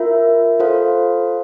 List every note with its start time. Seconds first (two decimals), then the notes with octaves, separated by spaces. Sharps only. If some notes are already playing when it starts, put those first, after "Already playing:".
Already playing: F4 A#4 E5
0.60 F4 A4 C5 F5